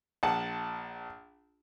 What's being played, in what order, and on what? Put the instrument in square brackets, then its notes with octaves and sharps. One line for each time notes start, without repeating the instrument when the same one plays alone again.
[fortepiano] A#1 F#5 A5